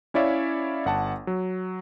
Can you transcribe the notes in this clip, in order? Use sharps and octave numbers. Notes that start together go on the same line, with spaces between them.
C#4 E4 C#5 D5 E5 F5
G1 F#5 A5
F#3